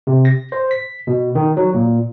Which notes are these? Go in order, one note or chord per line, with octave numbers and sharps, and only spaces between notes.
C3
A#6
C5
B6
B2
D#3
F#3
A#2